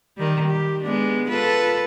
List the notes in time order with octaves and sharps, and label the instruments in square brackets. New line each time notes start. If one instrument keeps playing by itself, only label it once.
[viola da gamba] D#3 G3
G4
G#3 B3 D4
F4 A4 B4